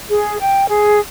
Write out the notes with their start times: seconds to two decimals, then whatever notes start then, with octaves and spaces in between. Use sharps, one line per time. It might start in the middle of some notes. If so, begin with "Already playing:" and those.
0.10 G#4
0.39 G5
0.68 G#4